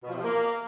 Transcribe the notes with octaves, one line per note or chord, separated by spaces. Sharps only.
B2
F3
C3
F3
A#3